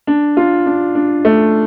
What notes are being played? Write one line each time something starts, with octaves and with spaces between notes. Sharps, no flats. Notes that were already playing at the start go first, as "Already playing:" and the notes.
D4
F4
D4
D4
A3